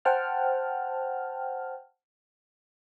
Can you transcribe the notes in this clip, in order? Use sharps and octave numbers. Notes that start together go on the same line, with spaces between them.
C5 F#5 G5 A5 F6